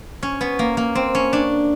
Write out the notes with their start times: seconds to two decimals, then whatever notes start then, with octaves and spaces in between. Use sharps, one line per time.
0.23 C#4
0.41 B3
0.59 A#3
0.77 A#3
0.95 C4
1.15 C#4
1.33 D4